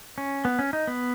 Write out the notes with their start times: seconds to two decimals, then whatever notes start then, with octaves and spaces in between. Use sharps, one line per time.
0.18 C#4
0.45 B3
0.59 C#4
0.73 D#4
0.87 B3